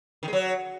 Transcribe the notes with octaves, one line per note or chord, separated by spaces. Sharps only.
D#3
G#3
F#3